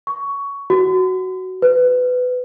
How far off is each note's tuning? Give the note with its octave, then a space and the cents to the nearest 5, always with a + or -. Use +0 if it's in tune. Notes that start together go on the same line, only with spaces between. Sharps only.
C#6 +15
F#4 +10
B4 +20